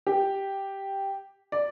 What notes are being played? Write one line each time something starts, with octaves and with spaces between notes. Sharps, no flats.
G4
D5